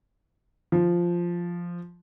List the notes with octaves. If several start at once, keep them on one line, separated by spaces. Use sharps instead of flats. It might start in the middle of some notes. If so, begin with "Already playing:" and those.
F3